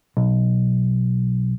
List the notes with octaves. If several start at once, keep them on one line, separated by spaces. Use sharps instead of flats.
B1